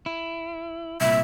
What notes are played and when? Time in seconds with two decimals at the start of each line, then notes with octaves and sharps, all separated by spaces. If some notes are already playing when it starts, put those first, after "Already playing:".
0.06 E4
1.01 C2 A#2 E5